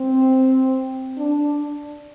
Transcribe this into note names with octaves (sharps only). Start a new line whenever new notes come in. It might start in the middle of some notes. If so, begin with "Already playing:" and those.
Already playing: C4
D4